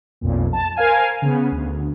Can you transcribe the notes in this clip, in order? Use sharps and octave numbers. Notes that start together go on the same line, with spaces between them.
B1 F2 A#2
A5
A#4 C5 F5 G#5
C#3 B3
D2